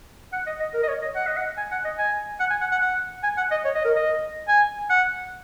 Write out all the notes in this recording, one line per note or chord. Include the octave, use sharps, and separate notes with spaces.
F#5
D#5
D#5
A#4
D#5
C#5
D#5
F#5
D#5
F#5
G#5
F#5
D#5
G#5
F#5
G#5
F#5
F#5
F#5
G#5
F#5
D#5
C#5
D#5
A#4
D#5
G#5
F#5